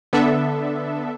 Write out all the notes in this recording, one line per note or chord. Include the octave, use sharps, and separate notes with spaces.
D3 B3 D4 A4 E5